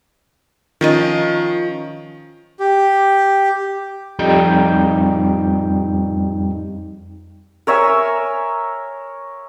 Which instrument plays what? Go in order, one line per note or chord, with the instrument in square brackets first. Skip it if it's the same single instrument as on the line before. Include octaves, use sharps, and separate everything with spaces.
[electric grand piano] D#3 [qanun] F3 C#4 D#5
[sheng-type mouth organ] G4
[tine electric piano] F2 G3 D#4 G5 G6
[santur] A#4 C#5 E5 G#5